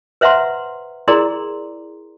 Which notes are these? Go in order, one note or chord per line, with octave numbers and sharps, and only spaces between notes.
B4 C5 E5 F#5 A#5 C6
E4 G#4 A#4 D5 A#5 C6